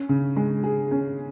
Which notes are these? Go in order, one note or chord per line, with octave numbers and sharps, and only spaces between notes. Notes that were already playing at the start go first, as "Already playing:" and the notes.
Already playing: C#4
C#3
G#3
G#4
C#4